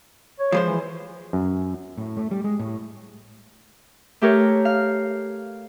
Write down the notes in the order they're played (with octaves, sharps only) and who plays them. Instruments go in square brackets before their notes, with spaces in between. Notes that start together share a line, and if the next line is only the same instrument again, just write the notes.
[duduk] C#5
[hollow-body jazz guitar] F3 G#3 C5
[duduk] E3
[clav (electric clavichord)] F#2
[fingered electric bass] A2
A3
G3
G#3
A2
[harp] A3 G4 A#4 C#5
F5